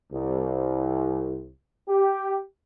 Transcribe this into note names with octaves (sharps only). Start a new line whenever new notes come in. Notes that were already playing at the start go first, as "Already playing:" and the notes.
C2
G4